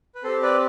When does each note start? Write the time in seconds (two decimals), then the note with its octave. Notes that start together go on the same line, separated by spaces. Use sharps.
0.15 B4
0.24 C4 G4 A4 C5
0.42 B4 D5